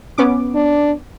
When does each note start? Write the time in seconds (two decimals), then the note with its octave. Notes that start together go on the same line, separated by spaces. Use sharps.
0.18 B3 C#4 D6
0.55 D4